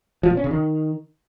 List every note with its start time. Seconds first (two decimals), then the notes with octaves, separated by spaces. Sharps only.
0.23 F3
0.30 A#2
0.37 C#4
0.44 C#3
0.51 D#3